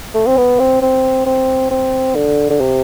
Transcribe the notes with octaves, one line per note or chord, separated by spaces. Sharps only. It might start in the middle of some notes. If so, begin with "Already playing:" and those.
A3
C4
B3
C4
C4
C4
C4
D3
D3
C3